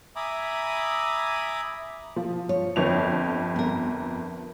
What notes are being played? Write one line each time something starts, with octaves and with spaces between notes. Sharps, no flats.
E5 G#5 A#5 B5 D6 D#6
F3
C#5
G1 F2 F7
B3 A#4